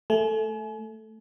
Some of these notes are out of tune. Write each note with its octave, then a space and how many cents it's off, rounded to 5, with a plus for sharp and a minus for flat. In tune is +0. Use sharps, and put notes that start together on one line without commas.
A3 +0 G#5 +40